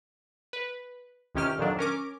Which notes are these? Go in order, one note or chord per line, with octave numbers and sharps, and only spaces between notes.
B4
C#2 C3 D#3 C#4 G4 F6
F2 A#2 D#3 F#3 D4
C#4 A#4 D6